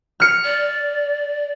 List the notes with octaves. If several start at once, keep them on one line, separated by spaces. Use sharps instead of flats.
F6 C#7
D5